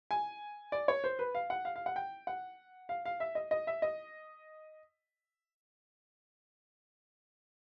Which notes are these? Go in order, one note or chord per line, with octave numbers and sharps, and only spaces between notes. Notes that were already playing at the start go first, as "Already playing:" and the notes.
G#5
D5
C#5
C5
B4
F5
F#5
F5
F5
F#5
G5
F#5
F5
F5
E5
D#5
D#5
E5
D#5